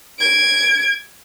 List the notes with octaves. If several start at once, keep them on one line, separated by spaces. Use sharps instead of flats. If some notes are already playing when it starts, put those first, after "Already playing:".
G#6 D7